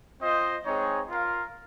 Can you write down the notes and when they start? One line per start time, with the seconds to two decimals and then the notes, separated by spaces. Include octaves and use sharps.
0.21 C4 F4 C5 D#5
0.65 G#3 C4 D#4 G#4 C#5
1.09 F4 A#4 F5